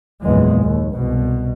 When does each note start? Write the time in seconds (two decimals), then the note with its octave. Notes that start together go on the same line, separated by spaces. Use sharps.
0.23 F#1 E2 A#2 F3 G#3
0.63 D#2
0.93 C2 B2